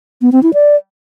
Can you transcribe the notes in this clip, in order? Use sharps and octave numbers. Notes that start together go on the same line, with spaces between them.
B3
C4
E4
D5